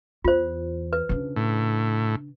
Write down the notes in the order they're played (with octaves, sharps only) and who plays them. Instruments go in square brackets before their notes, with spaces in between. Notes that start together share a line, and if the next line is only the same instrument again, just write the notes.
[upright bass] E2 [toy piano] F4 C5
[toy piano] B4
[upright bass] C#3 D4
[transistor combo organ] A2